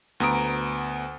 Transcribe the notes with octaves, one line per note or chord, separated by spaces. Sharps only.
D2 B3 A#5 D#6 D7